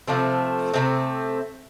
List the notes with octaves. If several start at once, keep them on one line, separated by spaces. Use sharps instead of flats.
C3 F3 A3 C4
C3 F3 A3 C4